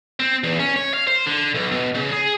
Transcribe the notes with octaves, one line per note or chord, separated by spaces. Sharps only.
C4
E2
C#4
C#5
F5
C5
D3
B1
B2
C#3
G#4